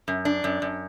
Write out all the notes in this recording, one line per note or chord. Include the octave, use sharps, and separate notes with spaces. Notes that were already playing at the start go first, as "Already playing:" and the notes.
F#2
D4
F#2
F#2